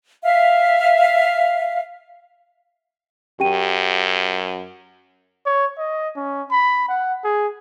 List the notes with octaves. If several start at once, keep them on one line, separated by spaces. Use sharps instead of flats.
E5 F5
F#2 G4 G5 D#7
C#5
D#5
C#4
B5
F#5
G#4